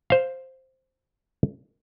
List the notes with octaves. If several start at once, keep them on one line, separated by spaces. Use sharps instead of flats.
C5 F5